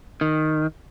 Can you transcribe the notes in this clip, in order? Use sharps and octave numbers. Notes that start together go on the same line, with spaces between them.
D#3